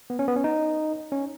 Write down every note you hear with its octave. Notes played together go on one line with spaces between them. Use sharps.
B3
C#4
B3
C#4
D#4
C#4